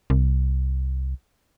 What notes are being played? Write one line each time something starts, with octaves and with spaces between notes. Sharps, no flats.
C2